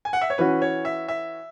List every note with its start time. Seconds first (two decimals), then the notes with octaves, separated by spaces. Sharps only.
0.05 G#5
0.13 F#5
0.21 E5
0.30 C#5
0.38 E3 C#4 F#4 B4
0.62 C#5
0.85 E5
1.08 E5